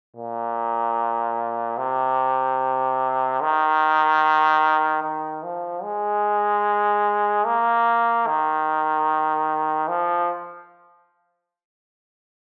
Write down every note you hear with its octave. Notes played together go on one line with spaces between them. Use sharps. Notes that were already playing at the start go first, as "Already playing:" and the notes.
A#2
C3
D#3
D#3
F3
G#3
A#3
D#3
F3